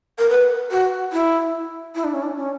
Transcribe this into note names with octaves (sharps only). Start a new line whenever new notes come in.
A#4
B4
F#4
E4
E4
D4
C#4
D4
C#4